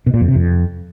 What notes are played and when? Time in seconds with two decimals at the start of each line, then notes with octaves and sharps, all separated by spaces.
0.07 B2
0.14 A#2
0.21 F2
0.28 C3
0.35 F2